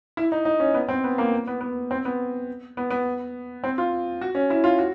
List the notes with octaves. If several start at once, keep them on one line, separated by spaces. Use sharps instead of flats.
E4
D#4
D#4
C#4
B3
C4
B3
A#3
B3
B3
C4
B3
B3
B3
C4
F4
F#4
C#4
E4
F4
F#4